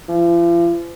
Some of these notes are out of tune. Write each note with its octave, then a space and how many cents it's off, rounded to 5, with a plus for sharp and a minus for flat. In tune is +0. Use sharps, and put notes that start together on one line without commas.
F3 -45